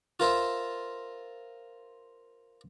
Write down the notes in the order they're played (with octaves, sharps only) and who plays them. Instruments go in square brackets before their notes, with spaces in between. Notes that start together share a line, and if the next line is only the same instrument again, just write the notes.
[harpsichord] F4 A#4 C5 E5